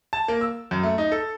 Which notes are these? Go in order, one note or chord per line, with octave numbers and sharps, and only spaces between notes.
A5
A#3
E6
F#2
A3
D#4
A4